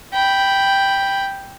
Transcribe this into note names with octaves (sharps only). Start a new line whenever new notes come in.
G5 B5